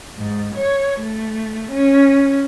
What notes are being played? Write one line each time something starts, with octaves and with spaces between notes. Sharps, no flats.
G#2
C#5
A3
C#4